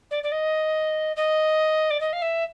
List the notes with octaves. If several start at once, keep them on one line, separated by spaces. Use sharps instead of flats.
D5
D5
D#5
D#5
D5
D#5
F5
E5